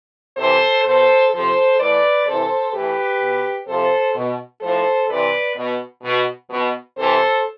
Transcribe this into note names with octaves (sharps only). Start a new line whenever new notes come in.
C3 E3 A4 C5
B2 A4 C5
C3 F3 A4 C5
A2 E3 B4 D5
C3 E3 A4 C5
A2 E3 G4 B4
B2
C3 F3 A4 C5
B2
A2 F3 A4 C5
C3 E3 B4 D5
B2
B2
B2
C3 E3 A4 C5